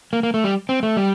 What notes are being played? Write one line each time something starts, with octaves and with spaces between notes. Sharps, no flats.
A#3
A#3
A3
G3
C4
A3
G3